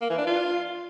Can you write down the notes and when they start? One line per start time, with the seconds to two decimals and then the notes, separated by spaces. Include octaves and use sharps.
0.01 A#3
0.10 E3
0.18 D4
0.26 F4